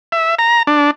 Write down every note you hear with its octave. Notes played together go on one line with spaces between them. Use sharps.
E5
A#5
D4